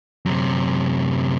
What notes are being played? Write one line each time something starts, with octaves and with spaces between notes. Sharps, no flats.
F#2 C3